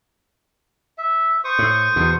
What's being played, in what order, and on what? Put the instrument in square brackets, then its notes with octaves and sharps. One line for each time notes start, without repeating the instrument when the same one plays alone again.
[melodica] E5
C5 C#6 D#6
[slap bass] A2
E2 B2